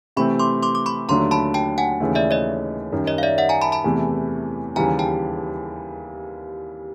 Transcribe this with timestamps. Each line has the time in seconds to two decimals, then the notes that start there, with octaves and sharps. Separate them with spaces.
0.16 C3 E3 A3 C4 B5 C#6
0.39 C6 D6
0.63 C6 D6
0.75 D6
0.86 B5 C#6
1.09 D#2 D3 F#3 A3 D4 A#5 C6
1.31 A5 B5
1.54 G5 A5
1.78 F#5 G#5
2.00 D#2 C#3 E3 A3
2.15 D5 E5
2.31 C#5 D#5
2.92 F#2 D#3 G3
3.07 C#5 D#5
3.18 F5
3.23 D5 E5
3.38 E5 F#5
3.49 G#5 A#5
3.62 A5 B5
3.72 A5 B5
3.84 E2 C3 E3 A3
4.76 D#2 C#3 E3 G3 G#5 A#5
4.99 G5 A5